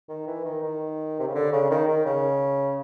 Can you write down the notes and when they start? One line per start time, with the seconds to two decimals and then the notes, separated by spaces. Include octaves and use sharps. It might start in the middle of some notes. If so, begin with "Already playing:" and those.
0.09 D#3
0.27 E3
0.45 D#3
0.63 D#3
1.20 C3
1.27 C#3
1.35 D3
1.53 C#3
1.71 D#3
1.88 D#3
2.06 C#3